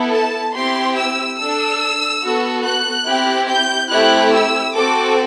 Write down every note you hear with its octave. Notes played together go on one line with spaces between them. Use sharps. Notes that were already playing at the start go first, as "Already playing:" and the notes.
Already playing: B3 E4 A4
A5
C4 E4 G4 C6
E6
D4 A4 E6
B3 F#4 A4
F#6
C4 E4 G4
G6
A3 C4 E4 G4 F#6
E6
C4 F#4 A4 D6